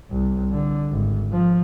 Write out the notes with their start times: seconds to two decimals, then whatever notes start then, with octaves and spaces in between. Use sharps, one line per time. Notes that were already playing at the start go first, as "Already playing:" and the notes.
0.11 C2
0.52 D3
0.91 G#1
1.32 F3